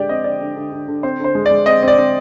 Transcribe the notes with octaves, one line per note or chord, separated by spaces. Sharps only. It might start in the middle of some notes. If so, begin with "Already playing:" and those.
Already playing: D3 G#3 G4 D5
C4 D#5
D3 D5
D3
D3
D3
D3
C4 C5
D3 C5
G#3
D5
G#3
C4 D#5
C4 D5
C4